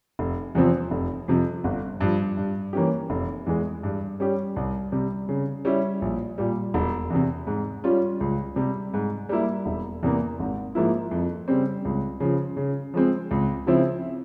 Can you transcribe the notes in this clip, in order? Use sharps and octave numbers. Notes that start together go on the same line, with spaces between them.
F1
E2 C3 F3 C4
F1
F2 C3 F3
G1
G2 F3
G2
E3 A#3 C#4 G4
F1
E2 E3 G#3
G2
G3 C#4 G4
C2
C3 G3
C#3
G3 C#4 E4
A#1
A#2 G3
E1
E2 C3
G#2
G3 C#4 F4
C#2
C3 G3
G#2
G3 A#3 E4
E1
E2 C3 E3 A#3
G#1
G#2 F3 A#3 E4
F2
C#3 G3 C4
C#2
C#3 F3
C#3
F3 G#3 C4
C#2
C#3 F3 C4 E4